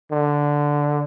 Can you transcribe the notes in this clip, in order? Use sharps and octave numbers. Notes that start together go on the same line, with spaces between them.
D3